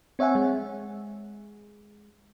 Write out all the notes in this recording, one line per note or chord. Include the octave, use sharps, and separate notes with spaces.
C4 C#5 E5 F#5 G#5
G#3